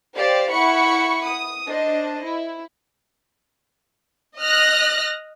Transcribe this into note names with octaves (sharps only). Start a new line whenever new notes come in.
G4 C5 D5 F5
E4 F#5 B5 C#6 C#7
D#6
D4 C5 D#5
E4
D#5 F6 F#6 A#6